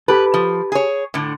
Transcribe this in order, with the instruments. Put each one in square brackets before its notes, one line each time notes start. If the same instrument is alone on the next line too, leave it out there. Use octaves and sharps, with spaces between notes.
[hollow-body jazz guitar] G4 A4 [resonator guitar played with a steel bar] B4
[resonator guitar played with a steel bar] F3
G#4 C#5
A2 D3